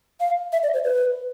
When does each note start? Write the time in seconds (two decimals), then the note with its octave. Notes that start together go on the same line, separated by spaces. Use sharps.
0.20 F5
0.53 E5
0.63 D5
0.74 C5
0.85 B4